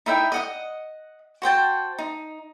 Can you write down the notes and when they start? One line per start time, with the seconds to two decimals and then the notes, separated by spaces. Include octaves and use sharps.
0.06 D#4 E4 E5 G5
0.32 D#5 F#5 D#6
1.42 F#4 C5 G5 A5
1.99 D#4